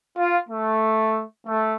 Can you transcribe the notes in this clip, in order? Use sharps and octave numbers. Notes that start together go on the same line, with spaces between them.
F4
A3
A3